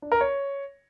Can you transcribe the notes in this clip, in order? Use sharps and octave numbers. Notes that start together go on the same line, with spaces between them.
D4
A#4
C#5